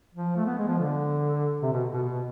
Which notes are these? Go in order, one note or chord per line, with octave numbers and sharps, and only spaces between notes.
F3
A3
B3
G#3
F3
D3
C3
B2
B2
B2